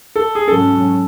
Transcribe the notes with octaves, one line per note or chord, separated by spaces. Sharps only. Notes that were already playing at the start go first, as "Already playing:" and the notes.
A4
G#4
G#2 F#3 C#4 A4